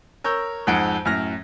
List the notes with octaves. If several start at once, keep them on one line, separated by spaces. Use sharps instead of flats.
A#4 C#5 E6 G6
F2 G#2 G#3 F#5 D7
F#2 A2 F6 A#6